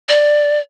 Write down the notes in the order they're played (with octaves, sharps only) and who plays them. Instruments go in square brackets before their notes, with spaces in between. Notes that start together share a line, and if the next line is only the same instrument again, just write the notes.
[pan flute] D5